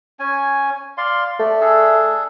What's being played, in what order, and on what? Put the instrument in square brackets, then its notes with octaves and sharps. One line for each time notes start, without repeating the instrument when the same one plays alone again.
[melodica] C#4 G#5
D5 F5 C6
[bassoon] A3 [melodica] D5
[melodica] D4 G#4 A4